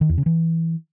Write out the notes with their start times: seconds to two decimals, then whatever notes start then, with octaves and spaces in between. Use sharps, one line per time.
0.01 D#3
0.09 E2
0.18 C#3
0.26 E3